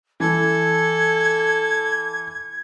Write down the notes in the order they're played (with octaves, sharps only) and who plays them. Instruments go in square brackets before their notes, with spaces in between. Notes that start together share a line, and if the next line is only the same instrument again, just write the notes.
[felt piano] E3 [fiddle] A4 [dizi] G#6